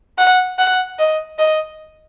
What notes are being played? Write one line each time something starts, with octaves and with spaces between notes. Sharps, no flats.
F#5
F#5
D#5
D#5